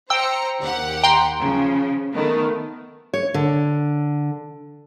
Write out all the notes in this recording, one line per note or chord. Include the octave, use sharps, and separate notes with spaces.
C5 G5 A#5 E6 C#7
D#2 G4 F#5
G5 A#5 C6
C#3 F3
D#3 A3 B3
C#5
D3